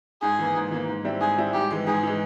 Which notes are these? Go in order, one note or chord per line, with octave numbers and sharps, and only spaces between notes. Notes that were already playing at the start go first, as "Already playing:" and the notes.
G#2 G#4
E3 A#3
G#2
E3 A#3
G#2
G3 C4 E4
G#2 G#4
G3 C4 E4
G#2 G4
E3 G#3
G#2 G#4
E3 G#3